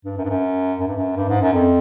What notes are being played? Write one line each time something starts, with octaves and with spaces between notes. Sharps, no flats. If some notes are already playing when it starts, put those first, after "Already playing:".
G2
F#2
G2
F#2
F#2
G2
F#2
G2
G#2
F#2
F2